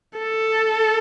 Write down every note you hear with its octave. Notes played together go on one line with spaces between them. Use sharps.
A4